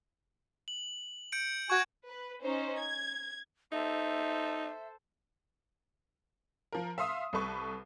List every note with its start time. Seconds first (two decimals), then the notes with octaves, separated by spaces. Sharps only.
0.68 F#7
1.32 G6 C#7 D7
1.70 F#4 G#5 C#6 F#6 G#6
2.09 B4
2.43 C#4 D#4 C5
2.79 G#6
3.72 D#4 A4 C5 E5
6.72 F3 A#4
6.98 E5 F5 C6 D#6
7.33 C2 A4 B4 C#6